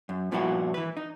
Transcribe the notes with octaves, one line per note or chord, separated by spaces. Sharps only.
F#2
G2 A#2 F3 B3 E4 F#4
E3 B4
D#4